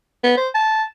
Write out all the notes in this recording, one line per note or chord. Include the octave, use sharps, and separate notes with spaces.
B3
C5
A5